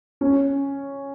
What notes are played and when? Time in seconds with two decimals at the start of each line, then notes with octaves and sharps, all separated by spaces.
0.21 C#4